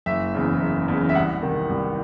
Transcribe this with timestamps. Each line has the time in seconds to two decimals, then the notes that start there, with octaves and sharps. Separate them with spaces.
0.06 F#1 E5
0.34 E2 C#3
0.61 F#1
0.88 E2 C#3
1.09 E5
1.15 C2 F#5
1.42 C3 D#3
1.70 C2